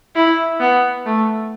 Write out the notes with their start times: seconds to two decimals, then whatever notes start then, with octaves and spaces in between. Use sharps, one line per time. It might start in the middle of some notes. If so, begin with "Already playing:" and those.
0.15 E4
0.60 B3
1.05 A3